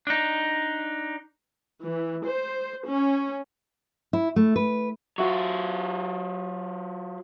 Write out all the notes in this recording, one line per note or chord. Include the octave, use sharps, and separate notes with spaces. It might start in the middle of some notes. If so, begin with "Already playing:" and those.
D4 D#4
E3
C5
C#4
E4
A3
B4
F#3 F4 F#4 E5 C#6